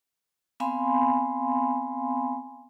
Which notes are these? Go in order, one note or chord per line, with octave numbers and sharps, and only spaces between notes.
B3 C4 F5 G#5 B5 C6